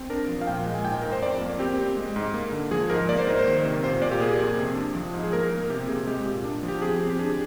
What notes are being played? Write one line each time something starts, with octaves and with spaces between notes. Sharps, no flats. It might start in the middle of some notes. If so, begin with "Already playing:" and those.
Already playing: C4
D4 A#4
F3
F5
A#2 G5
G#3
G#5
G#2 G5
G#2 A#4
C5
F2 D5
A#3
C4 G4
C4
G#3
G#2
A#3
D3
F3 G#4
G#2 A#4
A#3 D5
C5
G#2 A#4
C5
D#3
C3
A#2 C5
A#2 D5
G4
A#3 G#4
F2
C3
D4
F3
G#2
G#4
A#3 A#4
A#3
C3 G4
C3 G#4
G#3 G4
A#2
D4
F3
G4
C4 G#4
C4
G4
D4 G#4